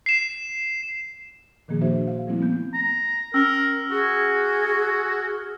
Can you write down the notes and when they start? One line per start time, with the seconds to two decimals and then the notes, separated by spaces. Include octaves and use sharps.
0.06 C7 E7
1.68 A#2 D#3 F3 A#3 G#4
1.81 D4 F#4 G#4 C5 E5
2.08 F5
2.27 F3 G3 A3 A#3 C4 E4
2.41 A3 B3 G6
2.74 A#5
3.34 C#4 A#4 E6 F6
3.91 F#4 G#4